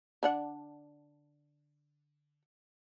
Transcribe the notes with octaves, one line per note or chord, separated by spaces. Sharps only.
D3 D4 F#5